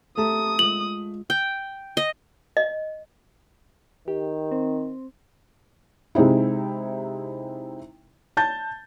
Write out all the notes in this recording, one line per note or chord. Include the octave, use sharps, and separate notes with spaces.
A3 G4 A5 A#5 D#6
G#3 F4 F#7
G5
D#5
D#5
D#3 G4
C4
C3 G#3 C4 D#4 E4
A5 G6 A6